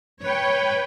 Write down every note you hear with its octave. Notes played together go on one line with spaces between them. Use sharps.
B4 C#5 G5